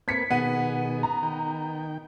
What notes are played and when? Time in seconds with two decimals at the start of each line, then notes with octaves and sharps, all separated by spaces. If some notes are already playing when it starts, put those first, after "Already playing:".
0.08 A#3 C4 B4 G#6 B6 C#7
0.30 B2 D#3 B3 G#4 F#5 D#7
1.03 A#5
1.23 D#3 G5